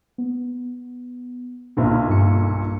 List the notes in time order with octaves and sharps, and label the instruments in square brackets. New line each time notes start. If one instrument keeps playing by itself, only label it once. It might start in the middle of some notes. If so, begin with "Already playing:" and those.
[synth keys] B3
[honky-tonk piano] B1 A#2 D3 [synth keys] D4 E5 F5
[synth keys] G2 C#7